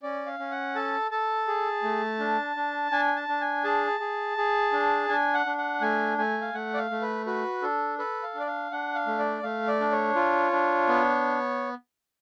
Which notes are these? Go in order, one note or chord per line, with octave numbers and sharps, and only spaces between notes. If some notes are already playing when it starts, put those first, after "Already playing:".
C#4 D5
F5
C#4
F#5
A4 A5
A4 A5
G#4
A3
D4
D4
D4 G#5
A5
D4
G#5
G#4 A5
G#4
G#4
D4
D4 G#5
F#5
D4
F#5
A3 G#5
A3 G#5
F5
A3 F#5
D5
F5
A3
B4
F#4 B4
D4 A4
A4 B4
F5
D4
D5
F5
D4 F#5
F5
A3
D5
A3 F5
D5
D4
C#5
F4
D4
B3